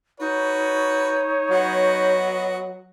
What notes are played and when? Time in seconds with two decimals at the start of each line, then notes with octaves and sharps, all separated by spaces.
0.20 D#4 F#4 B4 C#5
1.51 F#3 B3 F#4 D#5